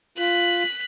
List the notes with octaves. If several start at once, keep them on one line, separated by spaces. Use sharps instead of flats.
F4 F#6 B6